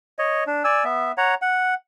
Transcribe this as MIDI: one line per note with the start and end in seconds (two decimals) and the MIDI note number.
0.19 0.44 73
0.19 0.44 75
0.47 0.63 62
0.64 0.84 74
0.64 0.84 80
0.64 0.84 88
0.84 1.12 59
0.84 1.12 76
1.17 1.34 73
1.17 1.34 78
1.17 1.34 82
1.42 1.74 78